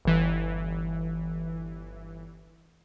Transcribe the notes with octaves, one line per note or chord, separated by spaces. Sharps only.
G1 E3